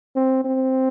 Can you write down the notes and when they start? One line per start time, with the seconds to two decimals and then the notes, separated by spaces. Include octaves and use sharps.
0.16 C4
0.44 C4